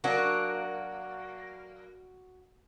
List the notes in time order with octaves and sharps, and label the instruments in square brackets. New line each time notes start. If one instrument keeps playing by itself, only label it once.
[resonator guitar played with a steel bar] F#3 A#3 D4 [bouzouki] F#4